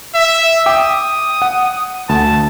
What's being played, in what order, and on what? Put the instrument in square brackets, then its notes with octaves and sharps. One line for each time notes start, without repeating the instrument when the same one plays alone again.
[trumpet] E5
[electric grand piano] G5 D6 [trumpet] D#6
[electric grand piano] F#5
[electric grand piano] D2 [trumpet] A5